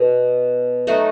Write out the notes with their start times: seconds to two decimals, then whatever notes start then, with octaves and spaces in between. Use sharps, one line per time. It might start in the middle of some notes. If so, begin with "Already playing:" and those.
Already playing: B2
0.87 F#3 A3 D#4 F#4